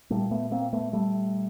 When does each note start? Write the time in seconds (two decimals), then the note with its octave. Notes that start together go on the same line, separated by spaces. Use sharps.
0.10 A#2 G3 A3
0.31 A3 B3
0.51 A#3 C4
0.73 A3 B3
0.93 G3 A3